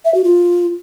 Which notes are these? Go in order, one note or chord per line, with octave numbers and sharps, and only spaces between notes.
E5
F#4
F4